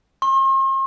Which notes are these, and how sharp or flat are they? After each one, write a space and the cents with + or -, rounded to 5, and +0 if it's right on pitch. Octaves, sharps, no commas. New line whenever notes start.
C6 +45